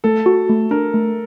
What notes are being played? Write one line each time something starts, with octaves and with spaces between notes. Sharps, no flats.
A3 A4
F#4
A3
D4 A#4
A3